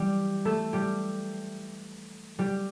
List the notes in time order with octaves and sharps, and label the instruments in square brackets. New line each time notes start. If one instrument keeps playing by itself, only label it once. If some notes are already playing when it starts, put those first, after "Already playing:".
Already playing: [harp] E3 G3 G4
A3 A4
G3 G4
G3 G4